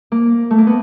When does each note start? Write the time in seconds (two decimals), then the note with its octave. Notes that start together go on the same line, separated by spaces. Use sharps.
0.12 A#3
0.51 A3
0.58 A#3
0.67 B3